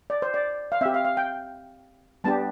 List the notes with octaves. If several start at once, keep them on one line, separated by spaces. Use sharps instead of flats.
D5
C5
D5
F5
C4 G4 E5
F5
F5
G5
G3 B3 D4 G4 A5